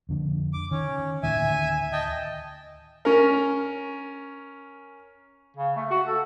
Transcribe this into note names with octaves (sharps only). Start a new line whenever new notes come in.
F2 D3
D6
D#3 C#4
D2 A2 D#3 E5 G#5
D#5 G5 A5
C#4 A#4
C#3
A3
F#4
A4